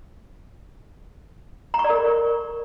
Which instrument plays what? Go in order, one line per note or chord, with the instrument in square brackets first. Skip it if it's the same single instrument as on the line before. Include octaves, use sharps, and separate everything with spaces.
[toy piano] A#5
C#6
D5
A#4